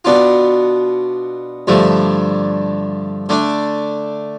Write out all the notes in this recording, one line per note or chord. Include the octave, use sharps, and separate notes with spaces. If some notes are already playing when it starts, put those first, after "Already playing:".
B2 B3 D4 F4
G2 D3 F3 A3
D3 A3 D4